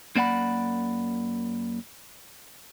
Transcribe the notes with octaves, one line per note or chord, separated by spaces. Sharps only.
F#2 A#3 D5 F#5 B5